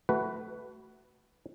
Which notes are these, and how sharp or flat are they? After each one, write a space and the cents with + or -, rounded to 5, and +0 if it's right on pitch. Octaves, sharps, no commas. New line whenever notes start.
A3 +0 F#4 +25 B4 +0